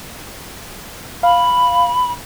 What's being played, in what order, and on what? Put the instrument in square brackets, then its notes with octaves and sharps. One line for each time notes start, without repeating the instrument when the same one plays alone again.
[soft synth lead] F5 [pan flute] B5